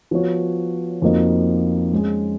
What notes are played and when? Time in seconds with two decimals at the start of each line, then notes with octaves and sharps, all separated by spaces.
0.11 F3 B3 F#4 C#5
1.02 F2 F3 A#3 D#4 F#4
1.93 G#3 C#4 G#4